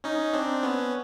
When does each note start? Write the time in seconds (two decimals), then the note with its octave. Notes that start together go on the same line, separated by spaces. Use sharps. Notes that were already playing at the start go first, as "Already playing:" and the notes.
0.04 C#4 D#4
0.33 C4 D4
0.63 B3 C#4